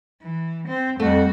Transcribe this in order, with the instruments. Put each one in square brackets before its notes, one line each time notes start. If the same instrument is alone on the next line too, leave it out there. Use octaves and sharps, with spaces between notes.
[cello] E3
C4
[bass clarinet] F2 [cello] G3 F#4 [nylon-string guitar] A3